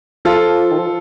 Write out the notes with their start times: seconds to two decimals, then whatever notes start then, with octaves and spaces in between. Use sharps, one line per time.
0.25 F3 F4 A4
0.71 D#3
0.79 F3